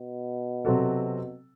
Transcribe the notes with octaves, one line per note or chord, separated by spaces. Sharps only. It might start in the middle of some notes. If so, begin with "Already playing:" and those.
Already playing: B2
C3 F#3 C4 F#4 A4